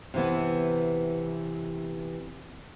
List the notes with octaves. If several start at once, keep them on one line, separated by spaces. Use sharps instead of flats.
C3 E3 B3